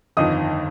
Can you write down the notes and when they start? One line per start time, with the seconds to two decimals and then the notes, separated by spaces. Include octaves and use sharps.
0.17 G1 F2 D#3 D#5 D#6